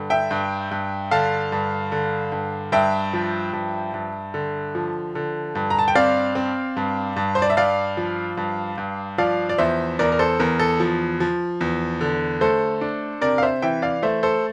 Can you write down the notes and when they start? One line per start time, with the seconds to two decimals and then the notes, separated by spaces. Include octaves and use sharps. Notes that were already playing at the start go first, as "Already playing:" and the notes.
Already playing: G2 D3
0.10 E5 G5
0.31 G2
0.71 G2
1.11 D3 F5 A5
1.52 G2
1.92 D3
2.32 G2
2.72 G2 E5 G5
3.13 F3
3.53 G2
3.94 G2
4.34 D3
4.75 F3
5.15 D3
5.55 G2
5.70 A#5
5.79 A5
5.88 G5
5.95 C4 D5 F5
6.35 C4
6.76 G2
7.16 G2
7.35 C5
7.42 D5
7.50 E5
7.57 G2 D5 F5
7.97 F3
8.37 G2
8.78 G2
9.18 F3 D5 F5
9.49 D5
9.58 E2 C5 E5
9.99 E2 A#4 D5
10.12 A#4
10.19 A4 C5
10.40 E2 A#4
10.60 A4
10.80 F3
11.20 F3
11.61 E2
12.01 D3
12.41 A3 A4 C5
12.81 D4
13.21 C3 A#4 D5
13.38 F5
13.42 C5 E5
13.62 E3 E5 G5
13.82 D5 F5
14.03 A3 C5 E5
14.23 A4 C5